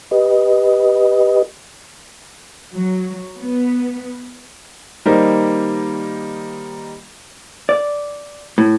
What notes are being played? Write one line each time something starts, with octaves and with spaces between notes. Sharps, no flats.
G4 B4 D#5
F#3
B3
D#3 G3 A#3 D#4 A#4 C5
D5
A2